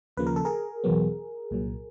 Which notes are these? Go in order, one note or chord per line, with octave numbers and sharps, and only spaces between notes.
D#2 C#3 F3 A#3 B4
A#4
A4
G#4 A#4
E2 B2 F#3 B3
C2 A#2 F#3